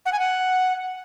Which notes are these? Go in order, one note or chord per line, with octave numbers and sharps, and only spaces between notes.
F#5
G#5
F#5